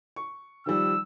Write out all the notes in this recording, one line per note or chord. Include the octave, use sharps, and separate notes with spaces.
C#6
D#3 F3 G3 E6